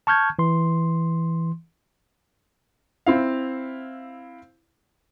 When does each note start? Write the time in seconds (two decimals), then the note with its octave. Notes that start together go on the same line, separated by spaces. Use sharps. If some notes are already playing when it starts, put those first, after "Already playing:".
0.07 A5 C#6 F6 G6 G#6
0.39 E3 C6
3.07 C4 E4 F5